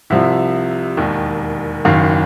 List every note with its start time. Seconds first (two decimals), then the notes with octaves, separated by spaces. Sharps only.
0.10 C2 C3 F3 E5
0.97 E1 D#2 D#3
1.85 F#1 F#2 D#3 F5